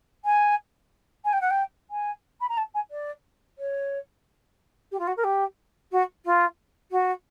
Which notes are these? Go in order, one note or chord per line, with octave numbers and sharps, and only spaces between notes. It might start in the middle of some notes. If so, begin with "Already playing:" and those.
G#5
G#5
G5
F#5
G5
G#5
B5
A#5
A5
G#5
D5
C#5
G4
F4
F#4
A#4
G4
F#4
F4
F#4